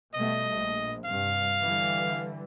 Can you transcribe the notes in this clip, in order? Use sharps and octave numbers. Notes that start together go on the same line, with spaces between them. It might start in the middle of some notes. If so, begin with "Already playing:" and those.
B2 G3 A3 D#5
A#1
G2 C3 F5
D3 E3 G3